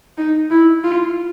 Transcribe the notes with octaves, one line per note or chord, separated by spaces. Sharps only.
D#4
E4
F4